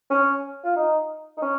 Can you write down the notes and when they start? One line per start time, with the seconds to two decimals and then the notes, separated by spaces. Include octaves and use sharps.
0.10 C#4
0.64 F4
0.76 D#4
1.37 D#4
1.42 C#4